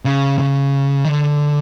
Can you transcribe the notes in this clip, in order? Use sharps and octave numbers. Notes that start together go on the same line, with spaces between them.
C#3
C#3
D#3
D3